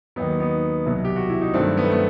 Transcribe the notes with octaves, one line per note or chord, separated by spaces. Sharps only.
D#2 D#3 F#3 B3 D#4
B3 D#4
C2 B2 F#3
G4
F#4
E4
D#4
G2 D#3 F#3 A3 C4
B3
A3
B3